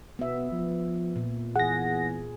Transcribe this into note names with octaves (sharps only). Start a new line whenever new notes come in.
B2 B3 E5
F3
A#2
E2 G#4 F#5 A#6